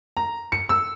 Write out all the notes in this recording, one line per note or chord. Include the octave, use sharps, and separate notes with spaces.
A#5
C#7
E6